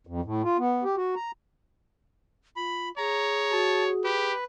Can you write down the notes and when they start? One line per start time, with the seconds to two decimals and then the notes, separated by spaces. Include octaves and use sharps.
0.07 F2
0.25 A2
0.44 F4
0.58 B3
0.84 G4
0.96 F#4
1.16 A#5
2.56 F4 B5
2.98 G#4 C#5 A#5
3.52 F#4 A5
4.04 G4 B4